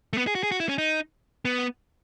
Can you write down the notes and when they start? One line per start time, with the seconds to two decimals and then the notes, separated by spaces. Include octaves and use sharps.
0.13 A3
0.18 B3
0.27 G#4
0.35 F#4
0.43 G#4
0.52 F#4
0.60 E4
0.69 C#4
0.78 D#4
1.45 B3